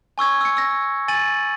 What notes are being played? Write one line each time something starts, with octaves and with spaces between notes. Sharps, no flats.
G#5 C#6 E6 G#6
E6 C#7
E6 A#6
G#5 A6 D#7 F#7